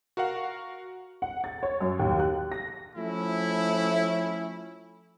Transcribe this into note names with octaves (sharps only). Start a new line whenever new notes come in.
F#4 A#4 F5 F#5
F#5
A6
C#5
F#2
D#2
F#6
A#6
F3 A3 C#4 E4